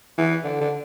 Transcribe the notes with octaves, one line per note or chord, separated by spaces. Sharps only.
E3
D3
D3